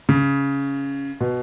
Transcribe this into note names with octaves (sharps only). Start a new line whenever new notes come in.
C#3
B2